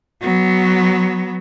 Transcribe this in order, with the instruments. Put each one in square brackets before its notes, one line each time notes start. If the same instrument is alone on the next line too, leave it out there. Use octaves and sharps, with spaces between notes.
[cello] F#3 B3